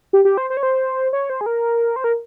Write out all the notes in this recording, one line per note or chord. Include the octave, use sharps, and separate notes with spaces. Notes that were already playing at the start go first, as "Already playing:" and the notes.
G4
G4
C5
C5
C#5
C5
C#5
C5
G#4
A#4
C5
A#4